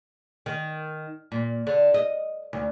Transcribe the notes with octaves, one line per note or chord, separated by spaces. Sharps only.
D#3
A#2
D3
D#5
D2